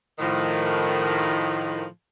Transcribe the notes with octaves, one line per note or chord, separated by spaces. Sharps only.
A2 D#3 F3